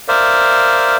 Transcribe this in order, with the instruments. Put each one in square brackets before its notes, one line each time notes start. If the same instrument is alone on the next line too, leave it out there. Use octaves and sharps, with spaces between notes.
[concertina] A#4 C5 D5 E5 F5